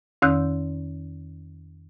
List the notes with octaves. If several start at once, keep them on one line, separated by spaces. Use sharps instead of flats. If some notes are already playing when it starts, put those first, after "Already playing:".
F2 D#3 C#4 E6 F#6 G6